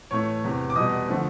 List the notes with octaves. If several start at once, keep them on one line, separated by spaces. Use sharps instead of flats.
A2 E3 A3 C#5 C#6
E2 C3 E3
D6
E2 B2 G3 D#5 D#6
D3 F3 A3